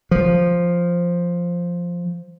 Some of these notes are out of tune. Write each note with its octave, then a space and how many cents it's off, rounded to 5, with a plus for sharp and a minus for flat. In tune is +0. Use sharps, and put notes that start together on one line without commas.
F3 +0